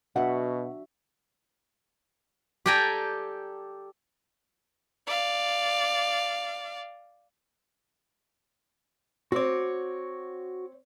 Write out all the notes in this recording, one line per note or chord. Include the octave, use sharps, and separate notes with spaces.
B2 D4 F#4 E5 F#5
G4 A4 D5 G5 G#5 A#5
D5 F5
C4 F#4 C#5 D6